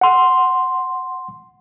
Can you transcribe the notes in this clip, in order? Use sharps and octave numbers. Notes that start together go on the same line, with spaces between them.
F#5 C6